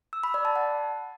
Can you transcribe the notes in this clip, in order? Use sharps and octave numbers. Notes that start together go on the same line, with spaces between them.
E6
B5
D5
A5
F#5